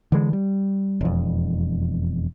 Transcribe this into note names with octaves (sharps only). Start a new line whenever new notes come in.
D3 E3 G#3
G3
E1 F2